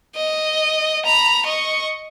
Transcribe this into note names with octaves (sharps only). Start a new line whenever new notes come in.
D#5
A#5 B5
D#5 C#6